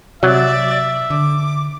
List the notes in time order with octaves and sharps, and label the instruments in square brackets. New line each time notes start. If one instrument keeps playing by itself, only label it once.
[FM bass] C3 [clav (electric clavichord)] F#3 [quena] D5 [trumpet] E5
[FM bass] D3 [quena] D6